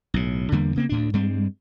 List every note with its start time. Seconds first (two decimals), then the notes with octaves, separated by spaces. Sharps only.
0.14 B1 A2
0.52 E2 D3 G3 A#3
0.76 C#3 A#3 C4
0.89 D2 A2 D4
1.13 G2 G3 G#3 C4